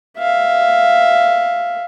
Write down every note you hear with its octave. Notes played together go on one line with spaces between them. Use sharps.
E5 F5